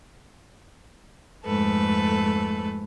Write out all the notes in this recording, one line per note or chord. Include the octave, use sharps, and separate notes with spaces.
F2 G#2 A3 A4 B4